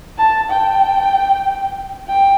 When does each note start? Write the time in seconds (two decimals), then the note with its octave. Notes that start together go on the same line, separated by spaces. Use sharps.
0.18 A5
0.50 G5
2.08 G5